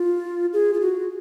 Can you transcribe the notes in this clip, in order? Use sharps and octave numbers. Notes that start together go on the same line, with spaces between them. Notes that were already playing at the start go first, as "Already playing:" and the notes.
Already playing: F4
G#4
F4
F#4